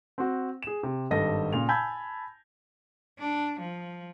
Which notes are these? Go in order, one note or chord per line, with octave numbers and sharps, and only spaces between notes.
C4 F#4
G#4 E7
C3
G#1 G2 A4 D#5 A5 A#6
A#2 C#3 F7
G#5 A5 B5 E6 G6 G#6
D4
F3